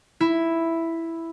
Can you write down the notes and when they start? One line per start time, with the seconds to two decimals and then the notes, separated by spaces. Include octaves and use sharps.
0.20 E4